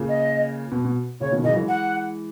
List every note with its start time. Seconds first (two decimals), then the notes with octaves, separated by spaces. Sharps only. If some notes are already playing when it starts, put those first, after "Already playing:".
Already playing: A#2 C#3
0.09 D#5
0.72 B2
0.85 B2
1.20 A#2 C#3 C#5
1.32 B2 D#3
1.44 C#3 E3 D#5
1.52 F#3
1.56 E3 G#3
1.68 F#5